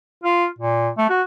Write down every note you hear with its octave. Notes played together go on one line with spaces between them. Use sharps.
F4
A#2
A3
F#4